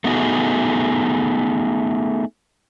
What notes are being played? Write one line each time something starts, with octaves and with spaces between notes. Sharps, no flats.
A3 B3 D#4 F#4 G#4